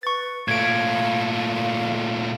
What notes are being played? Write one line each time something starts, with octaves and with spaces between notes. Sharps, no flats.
B4 C#6 A6
A#2 A3 F5 G#6 D7